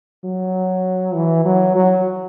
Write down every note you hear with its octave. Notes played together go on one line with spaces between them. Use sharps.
F#3
E3
F#3
F#3